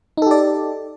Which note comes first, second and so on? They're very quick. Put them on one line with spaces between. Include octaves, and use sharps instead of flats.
D#4 A4 G4 D5